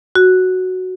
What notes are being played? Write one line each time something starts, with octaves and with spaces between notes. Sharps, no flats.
F#4